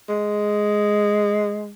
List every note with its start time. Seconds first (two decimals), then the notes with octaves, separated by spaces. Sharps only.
0.09 G#3